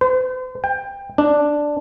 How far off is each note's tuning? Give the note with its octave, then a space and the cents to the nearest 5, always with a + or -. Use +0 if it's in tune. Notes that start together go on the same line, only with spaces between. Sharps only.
C5 -45
G5 +20
D4 +0